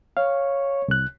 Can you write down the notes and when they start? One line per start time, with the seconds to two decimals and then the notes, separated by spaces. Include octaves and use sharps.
0.17 C#5 F5
0.88 C2 F#6